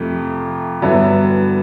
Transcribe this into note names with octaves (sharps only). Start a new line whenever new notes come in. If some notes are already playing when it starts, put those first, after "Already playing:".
Already playing: F2 C3 F3 A3
G2 D3 F#3 B3 E4